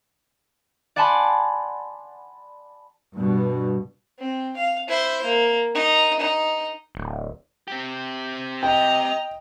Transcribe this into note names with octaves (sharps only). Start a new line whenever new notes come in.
D5 F#5 G#5 A5 B5 C6
G2 B2
C4
F5
E4 C5
A#3
D#4
D#4
D1
C4 G4
D#5 G5 A#5